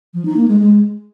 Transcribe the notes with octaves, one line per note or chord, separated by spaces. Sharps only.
F3
D#4
A#3
G#3
G#3